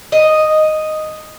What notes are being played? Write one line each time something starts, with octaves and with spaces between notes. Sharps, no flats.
D#5